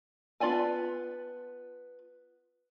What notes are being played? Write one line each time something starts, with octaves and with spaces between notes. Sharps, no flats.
B3 F4 D5 G#5 A5